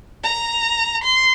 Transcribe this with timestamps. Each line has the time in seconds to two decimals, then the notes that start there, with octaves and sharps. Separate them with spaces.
0.24 A#5
1.03 C6